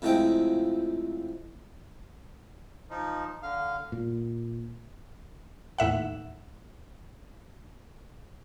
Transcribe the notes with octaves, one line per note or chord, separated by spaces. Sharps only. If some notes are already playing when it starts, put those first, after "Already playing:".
F2 A2 C3 F3 G#3 G5
F3 D#4
D3 F5
A#2
D#2 A2 E5 F#5